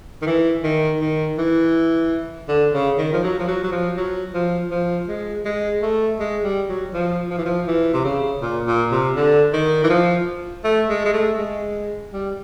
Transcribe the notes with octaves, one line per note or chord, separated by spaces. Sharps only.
D#3
E3
D#3
D#3
E3
D3
C#3
D#3
F3
F#3
F3
F#3
F#3
F3
F#3
F3
F3
G#3
G#3
A3
G#3
G3
F#3
F3
F3
E3
F3
E3
C3
C#3
A#2
A#2
C3
D3
D#3
E3
F3
A3
G#3
G#3
A3
G#3
G3